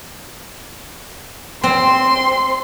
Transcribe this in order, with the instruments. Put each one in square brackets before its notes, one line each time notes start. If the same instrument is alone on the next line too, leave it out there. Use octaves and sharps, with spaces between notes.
[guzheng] C4 [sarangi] C6